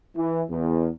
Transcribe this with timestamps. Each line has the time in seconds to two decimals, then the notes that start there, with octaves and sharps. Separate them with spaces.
0.15 E3
0.49 E2